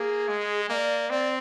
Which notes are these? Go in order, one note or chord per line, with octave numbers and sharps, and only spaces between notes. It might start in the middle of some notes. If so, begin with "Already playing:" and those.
Already playing: A#3 G#4
G#3
A#3 D5 D#5
C4 D5